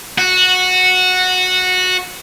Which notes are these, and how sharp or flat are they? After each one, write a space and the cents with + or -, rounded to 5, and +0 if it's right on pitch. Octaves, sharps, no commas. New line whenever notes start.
F#4 -10